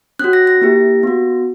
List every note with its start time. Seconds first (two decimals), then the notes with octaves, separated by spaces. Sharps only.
0.19 C#4 F#4 F#6
0.33 A#6
0.47 A#6
0.61 A#3 E4 G4
1.03 B3 F#4